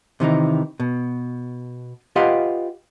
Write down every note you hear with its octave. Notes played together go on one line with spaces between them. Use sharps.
C3 D#3 E3 D#4
B2
F4 G4 B4 D#5 F5 F#5